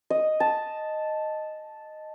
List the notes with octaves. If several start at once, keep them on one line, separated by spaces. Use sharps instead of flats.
D#5
A5